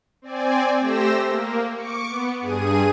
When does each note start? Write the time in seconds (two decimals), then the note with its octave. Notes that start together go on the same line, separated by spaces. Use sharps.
0.22 C4 D5 G#5
0.80 A3 G4 C5 E6 A#6 E7
1.26 A#3
1.75 C#6 D6 C#7
2.09 B3
2.41 G2 G#4 D#7